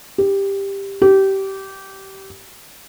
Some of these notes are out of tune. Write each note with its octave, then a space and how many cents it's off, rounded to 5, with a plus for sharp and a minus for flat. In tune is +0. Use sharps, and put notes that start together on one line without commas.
G4 +10
G4 -20